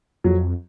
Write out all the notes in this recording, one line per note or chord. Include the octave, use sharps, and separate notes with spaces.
F2 F#3